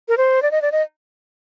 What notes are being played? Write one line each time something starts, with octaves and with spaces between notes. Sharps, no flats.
A#4
C5
D5
D#5
D5
D#5